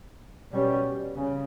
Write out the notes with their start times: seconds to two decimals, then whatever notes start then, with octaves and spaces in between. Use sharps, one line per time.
0.51 B2 G3 C#4
1.16 C#3